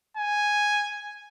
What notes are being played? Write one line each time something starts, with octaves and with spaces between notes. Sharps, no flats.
G#5